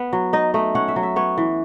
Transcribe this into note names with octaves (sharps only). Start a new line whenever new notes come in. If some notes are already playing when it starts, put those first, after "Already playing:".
Already playing: B3
F#3
D#4 D#5
A3 D#5
C#4 F#5
E5
F#3
E5
B3 C#5
E3